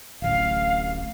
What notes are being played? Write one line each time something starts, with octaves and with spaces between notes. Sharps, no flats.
D1 A1 F5